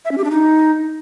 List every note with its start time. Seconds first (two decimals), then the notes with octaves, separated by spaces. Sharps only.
0.05 E5
0.11 C#4
0.18 G4
0.24 D4
0.31 D#4